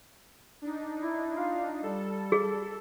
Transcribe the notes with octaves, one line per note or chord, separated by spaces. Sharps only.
D4 D#4
E4
F4 F5
G3 A4
G#4